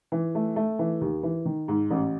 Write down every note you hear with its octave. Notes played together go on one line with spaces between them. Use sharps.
E3
A3
A3
E3
D#2
E3
D#3
G#2
A1